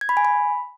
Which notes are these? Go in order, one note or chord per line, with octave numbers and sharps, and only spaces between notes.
G#6
B5
G#5
B5